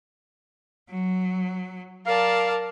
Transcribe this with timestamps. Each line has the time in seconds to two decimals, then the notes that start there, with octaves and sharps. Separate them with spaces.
0.88 F#3
2.06 A#4 D5 F5 A5